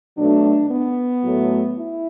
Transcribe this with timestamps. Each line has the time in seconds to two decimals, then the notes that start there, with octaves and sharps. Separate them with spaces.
0.16 B2 F#3 A3 D4
0.70 B3
1.23 A2 F#3 A3
1.76 E4